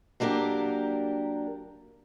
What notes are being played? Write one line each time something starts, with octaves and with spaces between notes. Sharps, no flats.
F#3 A#3 D4 G4 A#4